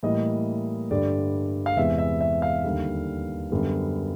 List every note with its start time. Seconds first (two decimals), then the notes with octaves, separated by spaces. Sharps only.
0.03 A2 E3 G3 A#3 D#5
0.91 G2 D3 G3 D5
1.66 F5
1.77 E2 C3 E3 G#3 B3 E5
1.98 E5
2.21 E5
2.42 F5
2.64 D#2 D3 G3
3.51 F#2 D3 G3 B3